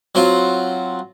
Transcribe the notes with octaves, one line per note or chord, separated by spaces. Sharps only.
F#3 C4 F4